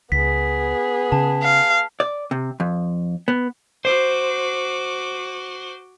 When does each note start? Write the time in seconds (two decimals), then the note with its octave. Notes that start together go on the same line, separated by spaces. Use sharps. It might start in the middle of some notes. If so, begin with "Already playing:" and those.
0.12 C#2 B3 G#4 B6
1.12 C#3 A5
1.43 F5
2.00 D5
2.31 C3
2.60 F2
3.28 B3
3.85 F#4 C5 D6